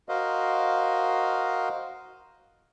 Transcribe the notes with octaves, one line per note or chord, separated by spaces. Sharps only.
F#4 A#4 C5 D#5 F5